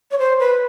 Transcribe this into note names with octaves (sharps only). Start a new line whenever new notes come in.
C#5
C5
B4